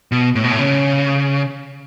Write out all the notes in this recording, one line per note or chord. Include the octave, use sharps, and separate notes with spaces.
B2
A2
B2
A2
C#3